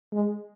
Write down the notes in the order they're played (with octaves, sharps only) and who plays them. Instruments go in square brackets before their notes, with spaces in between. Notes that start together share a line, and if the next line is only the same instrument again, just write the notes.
[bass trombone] G#3